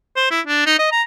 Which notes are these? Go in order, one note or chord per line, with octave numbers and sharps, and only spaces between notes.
C5
E4
D4
D#4
D#5
A#5